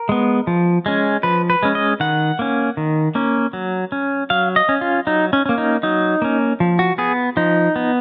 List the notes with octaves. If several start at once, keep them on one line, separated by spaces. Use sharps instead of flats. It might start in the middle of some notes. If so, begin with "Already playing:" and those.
Already playing: A#4
G#3 B3
F3
G#3 C#4
F3 B4
B4
G#3 C#4
D#5
D#3 F#5
A#3 C#4
D#3
A#3 C#4
F#3
C#4
F#3 F5
D#5
C#4
F4
F#3 D#4
C#4
A#3 C#4
D#4
F#3 D#4
A#3 C#4
F3
F#4
B3 G#4
F3 D#4
B3